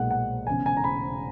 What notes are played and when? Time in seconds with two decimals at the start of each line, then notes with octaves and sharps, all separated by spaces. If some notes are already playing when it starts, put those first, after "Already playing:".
Already playing: B1 A#2 G#3 F#5
0.11 F#5
0.47 E1 E2 C#3 G#5
0.66 G#5
0.77 A#5
0.84 B5